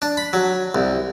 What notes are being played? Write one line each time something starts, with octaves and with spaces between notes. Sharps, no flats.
D4
B5
F#3
C2